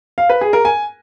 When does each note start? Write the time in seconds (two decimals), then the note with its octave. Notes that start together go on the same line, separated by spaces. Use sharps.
0.18 F5
0.30 B4
0.41 G#4
0.53 A#4
0.65 G#5